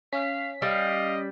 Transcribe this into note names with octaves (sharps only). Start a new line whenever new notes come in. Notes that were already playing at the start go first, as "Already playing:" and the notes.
C#4 F5 B6
G3 D#5 F5